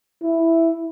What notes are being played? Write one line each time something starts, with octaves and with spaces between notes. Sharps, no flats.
E4